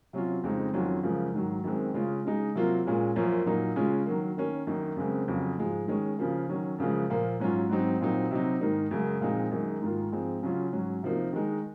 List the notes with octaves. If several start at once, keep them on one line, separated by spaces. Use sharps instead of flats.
C3 F#3 C#4 F4
F2 C#3 G#3 C4 D#4
F2 D#3 F#3 C#4 F4
F#2 C#3 F3 G#3
G#2 D#3 F#3
F#2 D#3 G#3 C4
C#3 G#3 C#4 F4
C#3 G#3 D#4
C3 F#3 A#3 F4
A#2 G#3 C#4 F4
F#2 F3 A#3 C#4 F4
A#2 F#3 A#3 D#4
C#3 G#3 C#4 F4
D#3 F#3 A#3
D#3 A#3 C#4
F#2 D#3 A#3 D#4
F#2 C#3 G#3 C4
F2 C#3 F#3
G#2 F3 G#3
D#3 G#3 C#4
C#3 F3 A#3
D#3 F#3 C#4
F#2 C#3 F3 G#3
A#2 F3 A#3
G#2 F#3 C#4 F4
G#2 F#3 C4 D#4
A#2 F#3 C4 D#4
C3 F#3 C4 D#4
G#2 D#3 A#3 D#4
F#2 C#3 G#3
A#2 F3 G#3 C4 D#4
F#2 D#3 G#3 D#4
G#2 D#3 A#3 F4
G#2 F3 G#3 C4
C#3 F#3 C#4 F4
G#2 F#3 C#4
C3 F3 A#3 D#4
D#3 G#3 D#4